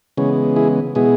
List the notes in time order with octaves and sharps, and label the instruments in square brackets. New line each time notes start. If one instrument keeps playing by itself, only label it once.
[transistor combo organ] C#3 E3 G#3 B3 C#4
E4 G#4
B2 G#3 B3 E4 G#4